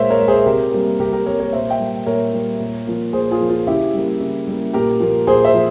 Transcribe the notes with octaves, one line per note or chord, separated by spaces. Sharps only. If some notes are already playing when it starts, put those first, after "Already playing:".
Already playing: A#2 G#3 A#4 C5 C#5 E5 F5
A#4 C#5
G#3
G#4 C5
C3 G4 A#4
G3 A#3
C3 G4 A#4
G4 A#4
G3 A#3 A#4 C#5
A#4 C#5
A#2 C5 E5
E5 G5
G3 A#3
A#2 A#4 C#5
G3 A#3
A#2
F3 A#3
A#2 G#4 C5
F4 G#4
F3 A#3
F4
C#3 E4 G4
G3 A#3
C#3
G3 A#3
A#2 G4 A#4
F3 A#3
A#2 G#4 C5
C5 E5
F3